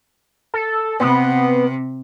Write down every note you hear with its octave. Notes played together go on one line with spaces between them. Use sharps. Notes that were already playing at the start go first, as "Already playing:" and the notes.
A4
C3 B3